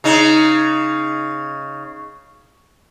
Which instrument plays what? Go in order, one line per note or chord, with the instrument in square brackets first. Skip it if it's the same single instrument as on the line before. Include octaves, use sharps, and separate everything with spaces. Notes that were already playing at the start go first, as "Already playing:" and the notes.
[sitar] C#3 D#4